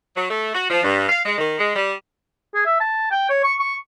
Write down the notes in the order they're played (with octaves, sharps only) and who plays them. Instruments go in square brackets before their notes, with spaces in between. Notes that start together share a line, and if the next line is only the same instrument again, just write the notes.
[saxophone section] F#3
A3
F#4
F3
G2
F5
G#3
D#3
G#3
G3
[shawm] G#4
E5
A5
G5
C#5
C#6
C#6